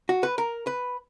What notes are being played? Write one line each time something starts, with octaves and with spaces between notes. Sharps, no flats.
F#4
B4
A#4
B4